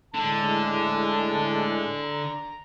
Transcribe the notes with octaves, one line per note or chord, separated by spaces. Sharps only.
A2 D3 G#3 A5
A#5